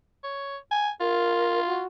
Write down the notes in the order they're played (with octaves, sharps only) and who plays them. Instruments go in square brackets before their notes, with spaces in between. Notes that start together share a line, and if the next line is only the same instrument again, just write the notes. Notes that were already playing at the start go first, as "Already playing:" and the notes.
[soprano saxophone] C#5
G#5
[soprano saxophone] F4 [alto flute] A#4
[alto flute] F#4